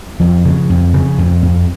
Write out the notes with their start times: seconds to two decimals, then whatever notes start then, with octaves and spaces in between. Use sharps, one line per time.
0.20 F2 F3
0.45 C#3
0.70 F2
0.94 C#3
1.18 F2
1.43 F2